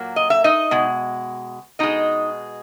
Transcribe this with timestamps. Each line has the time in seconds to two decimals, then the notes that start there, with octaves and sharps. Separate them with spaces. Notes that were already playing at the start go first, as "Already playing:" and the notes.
Already playing: A#2 F#3 A#3
0.16 D#5
0.30 E5
0.44 D#4 D#5
0.71 B2 G#3
1.79 B2 G#3 D#4 D#5